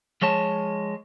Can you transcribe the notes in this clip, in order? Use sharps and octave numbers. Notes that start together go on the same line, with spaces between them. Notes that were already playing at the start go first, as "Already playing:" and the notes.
F3 G#3 C#5 A5